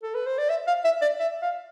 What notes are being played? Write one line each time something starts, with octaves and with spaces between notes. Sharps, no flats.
A4
B4
C5
D5
E5
F5
E5
D5
E5
F5